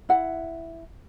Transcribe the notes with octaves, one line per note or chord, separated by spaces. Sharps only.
E4 F#5